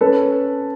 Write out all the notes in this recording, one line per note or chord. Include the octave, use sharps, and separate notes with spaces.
C#4 A4 B4